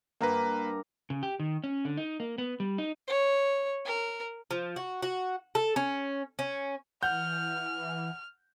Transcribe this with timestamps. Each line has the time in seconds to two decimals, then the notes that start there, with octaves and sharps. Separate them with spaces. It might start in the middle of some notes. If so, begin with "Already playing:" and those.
0.21 G2 A#3 A#4 B4 A#5
1.10 C#3
1.23 G4
1.40 D#3
1.64 C#4
1.85 D3
1.97 D#4
2.20 A#3
2.38 B3
2.60 G3
2.78 D#4
3.07 C#5
3.85 A#4
4.51 F3
4.76 F#4
5.02 F#4
5.55 A4
5.76 C#4
6.39 C#4
7.03 E3 F#5 F6 G6